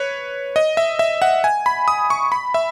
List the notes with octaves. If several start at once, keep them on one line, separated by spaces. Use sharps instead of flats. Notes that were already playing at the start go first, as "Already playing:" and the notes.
Already playing: B4 C#5
D#5
E5
E5
F#5
G#5
B5
D#6
C#6
B5
E5